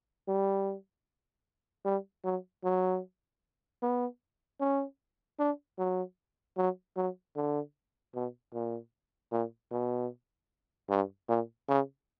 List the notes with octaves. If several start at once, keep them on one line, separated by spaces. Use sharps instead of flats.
G3
G3
F#3
F#3
B3
C#4
D4
F#3
F#3
F#3
D3
B2
A#2
A#2
B2
G2
A#2
C#3